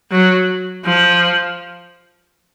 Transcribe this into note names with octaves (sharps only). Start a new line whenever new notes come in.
F#3
F3